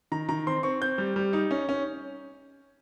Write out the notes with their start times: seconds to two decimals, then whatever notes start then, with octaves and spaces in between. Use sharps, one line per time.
0.12 D#3 A#5
0.29 D#3 A#5
0.47 C4 C6
0.63 C4 C#6
0.81 C4 G6
0.98 G3
1.16 G3
1.33 D#4
1.51 C#4
1.69 C#4